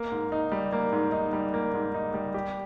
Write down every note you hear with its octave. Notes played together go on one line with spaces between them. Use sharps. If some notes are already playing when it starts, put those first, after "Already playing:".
Already playing: A#3
G#2
D#4
G3
A#3
G#2
D#4
G3
A#3
G#2
D#4
G3
G4